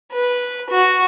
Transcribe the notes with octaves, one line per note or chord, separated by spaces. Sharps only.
B4
F#4